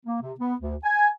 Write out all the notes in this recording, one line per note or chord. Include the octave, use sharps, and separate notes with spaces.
A#3
C3
B3
D2
G#5